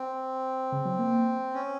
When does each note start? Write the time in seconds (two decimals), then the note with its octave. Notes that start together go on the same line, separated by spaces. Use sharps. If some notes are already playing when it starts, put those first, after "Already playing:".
Already playing: C4
0.72 C#3
0.85 F#3
0.99 A#3
1.54 C#4